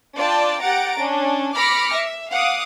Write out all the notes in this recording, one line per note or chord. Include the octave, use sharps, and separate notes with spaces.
D4 F4 D5 G5 A5
G4 F#5 A#5 A6 D7
C#4 D4
B5 D6 F6 A#6 C#7
E5
F5 F#5 D6 D#6